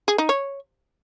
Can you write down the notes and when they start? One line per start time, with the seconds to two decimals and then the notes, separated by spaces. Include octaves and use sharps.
0.08 G#4
0.18 D#4
0.29 C#5